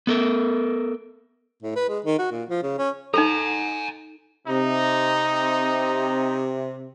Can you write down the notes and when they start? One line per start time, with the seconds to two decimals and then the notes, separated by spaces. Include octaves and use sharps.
0.07 B3 A4 A#4
1.63 A2
1.76 B4
1.89 G#3
2.05 D#3
2.19 F#4
2.31 A#2
2.49 F3
2.63 C#3
2.78 C#4
3.14 D#4 A4 G#5 A#5
4.48 C3 D#4